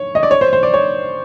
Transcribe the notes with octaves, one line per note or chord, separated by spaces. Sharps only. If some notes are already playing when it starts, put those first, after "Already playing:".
Already playing: C#5
D#5
D5
C#5
C5
C5
D5
C#5